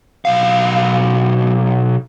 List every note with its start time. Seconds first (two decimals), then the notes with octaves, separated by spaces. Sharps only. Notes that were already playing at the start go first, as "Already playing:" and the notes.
0.25 B1 F5